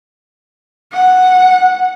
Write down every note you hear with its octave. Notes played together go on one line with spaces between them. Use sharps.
F#5